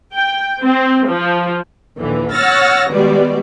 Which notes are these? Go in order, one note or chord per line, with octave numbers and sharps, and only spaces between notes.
G5
C4
F3
A#1 D#2 D3 E3
C#5 F#5 E6 F6 A6 A#6
B2 D#3 G3 G#3 D5